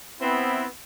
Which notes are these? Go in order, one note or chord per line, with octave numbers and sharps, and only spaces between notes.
B3 C4 E4